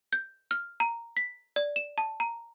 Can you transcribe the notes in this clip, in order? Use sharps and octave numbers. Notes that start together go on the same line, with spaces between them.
G6
F6
A#5
B6
D5
E7
A5
A#5